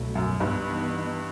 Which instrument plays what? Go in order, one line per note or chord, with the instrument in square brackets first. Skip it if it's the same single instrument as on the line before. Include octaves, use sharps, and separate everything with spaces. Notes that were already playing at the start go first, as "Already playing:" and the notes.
Already playing: [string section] C2 B2 F#3 A3
[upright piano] F#2
[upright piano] G2 [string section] E3 B3 D#4